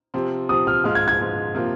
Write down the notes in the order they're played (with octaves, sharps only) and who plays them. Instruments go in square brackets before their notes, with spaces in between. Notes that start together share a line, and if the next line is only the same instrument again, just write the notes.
[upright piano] C3 F3 C4
[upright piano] C3 F3 C4 [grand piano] D#6
[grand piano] F6
[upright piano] G#2 F3 G#3 F4 [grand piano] F6
[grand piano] G#6
G#6
[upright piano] G#2 F3 G#3 F4
C3 F3 A#3 F4